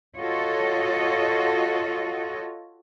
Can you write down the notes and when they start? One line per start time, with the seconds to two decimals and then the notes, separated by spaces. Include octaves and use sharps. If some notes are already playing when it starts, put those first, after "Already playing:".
0.18 F4 F#4 A4 C#5 D#5